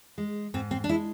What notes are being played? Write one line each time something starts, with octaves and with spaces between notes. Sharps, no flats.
G#3
G#2 C4
C4
D4
G#3 E4